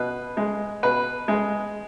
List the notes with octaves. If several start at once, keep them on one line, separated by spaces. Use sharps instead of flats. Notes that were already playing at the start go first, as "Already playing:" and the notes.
Already playing: B2 B4
G#3
B2 B4
G#3